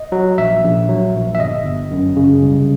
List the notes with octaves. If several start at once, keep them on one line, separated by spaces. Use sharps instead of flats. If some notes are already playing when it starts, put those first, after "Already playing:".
Already playing: D#5
F#3
A#1 E5
A#1
F#3
A#1
E5
G1 D#5
G1
F#2
C#3
C2